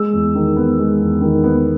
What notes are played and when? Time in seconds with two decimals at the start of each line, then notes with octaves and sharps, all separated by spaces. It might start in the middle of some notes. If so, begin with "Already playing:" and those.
Already playing: G#3 E6
0.13 E2
0.35 D#3
0.56 B3
0.79 G#3
1.01 E2
1.21 D#3
1.44 B3